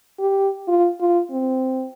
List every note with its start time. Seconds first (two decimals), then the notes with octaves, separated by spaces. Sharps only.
0.19 G4
0.68 F4
1.01 F4
1.31 C4